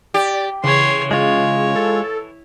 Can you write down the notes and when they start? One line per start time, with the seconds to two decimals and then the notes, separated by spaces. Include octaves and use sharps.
0.14 G4 D5
0.64 C#3 E3 C#5 C6
1.11 G#3 F4 C#5
1.76 A4